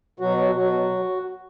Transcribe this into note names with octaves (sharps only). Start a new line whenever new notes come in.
B2 F#3 F#4
F#3
B2 F#3 F#4
F#3